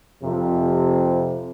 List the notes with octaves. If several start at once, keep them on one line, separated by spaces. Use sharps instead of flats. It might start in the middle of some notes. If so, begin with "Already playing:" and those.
F2 C3